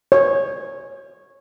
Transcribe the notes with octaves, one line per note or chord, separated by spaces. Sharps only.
C#5